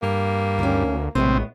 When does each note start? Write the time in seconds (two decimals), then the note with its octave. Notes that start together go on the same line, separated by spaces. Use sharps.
0.02 G2 A#3
0.59 D2 D#3 C#4
1.15 A#1 A2 C3 G#3 B3 C4